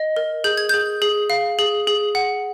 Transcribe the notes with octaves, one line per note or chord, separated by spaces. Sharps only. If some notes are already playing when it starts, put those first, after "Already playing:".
Already playing: D#5
A#4
G#4 G6
G#6
G#4 G6
G#4
F5
G#4
G#4
F#5